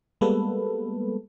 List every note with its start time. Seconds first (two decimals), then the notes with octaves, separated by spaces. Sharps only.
0.21 G3 G#3 A#3 B3 A4 B4